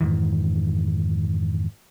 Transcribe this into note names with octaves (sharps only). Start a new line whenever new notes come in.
F2 G#2 D#3 E3